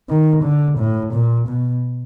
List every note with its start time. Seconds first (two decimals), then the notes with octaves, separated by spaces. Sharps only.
0.09 D#3
0.44 D3
0.79 A2
1.13 A#2
1.48 B2